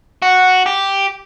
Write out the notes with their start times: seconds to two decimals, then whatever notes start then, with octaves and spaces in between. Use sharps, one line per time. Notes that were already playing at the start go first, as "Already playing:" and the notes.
0.22 F#4
0.66 G4